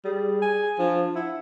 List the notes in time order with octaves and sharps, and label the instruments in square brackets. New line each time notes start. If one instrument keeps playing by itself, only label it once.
[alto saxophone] G3 [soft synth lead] G#4
[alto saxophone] G#5
[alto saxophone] F3 [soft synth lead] D4
[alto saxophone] E4 [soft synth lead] F#5